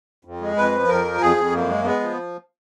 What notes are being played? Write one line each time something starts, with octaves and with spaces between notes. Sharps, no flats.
F2
G#3
F2 B4
F3
F2 A#4
F3
F2 G#4
F2
F#2 A#3
G#3
G#3 B3
F3